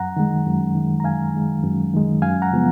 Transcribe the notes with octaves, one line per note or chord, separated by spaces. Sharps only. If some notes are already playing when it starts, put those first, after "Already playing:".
Already playing: F#2 F#5 A#5
D#3 G#3
F#2
D#3 G#3
A#5
F#2 F5 G#5
D#3 G#3
F#2
D#3 G#3
F#2 F5 G#5
F#5 A#5
C#3 F3 G#3 B3